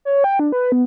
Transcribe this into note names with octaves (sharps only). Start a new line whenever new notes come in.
C#5
G5
D4
B4
B3